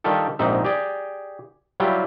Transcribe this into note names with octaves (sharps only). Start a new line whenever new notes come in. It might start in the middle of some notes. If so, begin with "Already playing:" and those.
D#3 G3 D4 F4 G4 A4
A#1 G#2 C4 D#4 E5
G4 G#4 D5
F#3 G3 E4 F4 G4